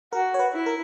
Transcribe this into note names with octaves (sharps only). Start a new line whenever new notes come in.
F#4 A#4
C#5
B4
E4
A#4